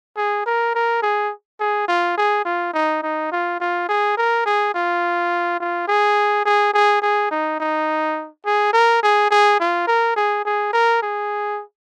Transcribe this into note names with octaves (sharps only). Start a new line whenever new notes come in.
G#4
A#4
A#4
G#4
G#4
F4
G#4
F4
D#4
D#4
F4
F4
G#4
A#4
G#4
F4
F4
G#4
G#4
G#4
G#4
D#4
D#4
G#4
A#4
G#4
G#4
F4
A#4
G#4
G#4
A#4
G#4